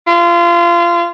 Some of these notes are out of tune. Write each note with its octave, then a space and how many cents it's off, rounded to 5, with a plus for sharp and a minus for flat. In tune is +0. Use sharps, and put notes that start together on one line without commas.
F4 -25